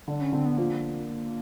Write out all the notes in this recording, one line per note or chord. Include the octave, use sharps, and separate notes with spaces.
D3 D4
C#4
D3 C4
B3
F3 A#3